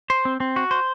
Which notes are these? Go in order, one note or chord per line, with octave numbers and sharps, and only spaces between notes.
C5
C4
C4
F#4
C5